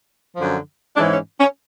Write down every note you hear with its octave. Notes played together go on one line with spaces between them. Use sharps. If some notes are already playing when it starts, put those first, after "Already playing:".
F#2 D3 F3
G#2 E3 G#3 C#4 D4
C#4
C#4